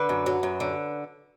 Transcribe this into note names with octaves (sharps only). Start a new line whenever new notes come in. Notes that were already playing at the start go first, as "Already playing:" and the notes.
Already playing: D3 B4
F#2
F#3
F#2
D3